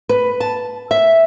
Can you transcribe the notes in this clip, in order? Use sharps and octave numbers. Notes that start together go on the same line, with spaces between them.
B4
A5
E5